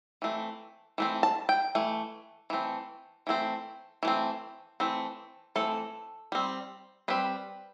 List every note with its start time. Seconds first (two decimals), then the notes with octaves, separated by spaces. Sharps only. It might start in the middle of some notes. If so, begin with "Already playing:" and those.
0.22 E3 A3 C4
0.98 E3 A3 C4
1.23 A5
1.49 G5
1.75 E3 A3
2.50 E3 A3 C4
3.27 E3 A3 C4
4.03 E3 A3 C4
4.80 E3 A3 C4
5.55 E3 A3 C4 A4
6.32 G3 C4
7.08 G3 C4 B4